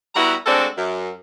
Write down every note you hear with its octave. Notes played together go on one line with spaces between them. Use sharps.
G3 B3 E4 F#4 A#5
G#3 A3 C4 D4 F#4 A4
F#2